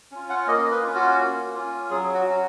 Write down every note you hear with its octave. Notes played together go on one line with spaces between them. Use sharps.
C#4 F4
F#5
A#3 D#5
B4
C#4 F4
F#4
A#3
C#4 F4
F#3 G#4
F#4
C#4 F#4